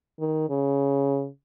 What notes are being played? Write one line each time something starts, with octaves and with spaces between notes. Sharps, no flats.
D#3
C#3